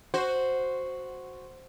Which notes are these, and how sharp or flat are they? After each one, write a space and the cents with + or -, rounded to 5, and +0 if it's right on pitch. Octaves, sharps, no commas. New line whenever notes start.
F#4 +0 C5 +0